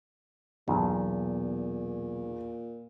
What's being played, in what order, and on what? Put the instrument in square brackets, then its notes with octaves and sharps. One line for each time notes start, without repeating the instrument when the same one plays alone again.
[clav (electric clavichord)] B1 [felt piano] E2 [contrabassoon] A#2